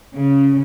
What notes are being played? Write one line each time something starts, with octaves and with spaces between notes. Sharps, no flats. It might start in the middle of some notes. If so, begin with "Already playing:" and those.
C#3